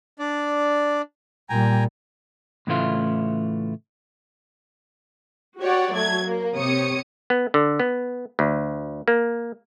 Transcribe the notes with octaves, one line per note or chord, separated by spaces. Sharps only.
D4 D5
A#2 G3 G5 G#5 A#5
A2 C#3 E3 A3 E4 F4
F#4 G4 C#5 D5 F#5
F#3 A3 F#4 G#6
A#3
C3 G4 C#5 D#6 C#7
B3
D3
B3
D2
A#3